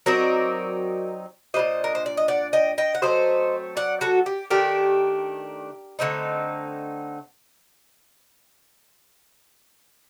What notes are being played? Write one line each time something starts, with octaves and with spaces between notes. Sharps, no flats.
F#3 C4 D#4 A#4 D5
A#2 G3 D4 C5 D#5
A#4
C5
D5
D#5
D5 F#5
D#5 G5
D#5 G5
F#5
F#3 A3 C4 C5 D#5
D5 F#5
F#4 A4
G4
D#3 A3 D4 G4 A#4
D3 A3 C4 D#4